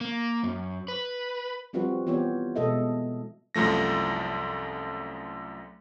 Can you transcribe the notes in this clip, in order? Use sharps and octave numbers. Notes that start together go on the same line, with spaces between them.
A#3
F#2
B4
F3 G3 C4 F4 F#4 B4
E3 B3 F4 G4 C5 C#5
B2 G#3 A4 D#5 E5
C2 F#2 F3 A3 A#6